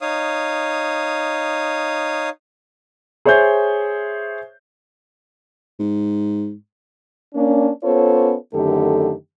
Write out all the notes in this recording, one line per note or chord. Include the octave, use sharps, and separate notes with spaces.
D#4 C#5 F5 D#6
G#4 C5 C#5 E5 G6
G#2
A#3 C#4 D4
B3 C#4 F4 A4 C5 C#5
F#2 D3 D#3 A3 G4 A4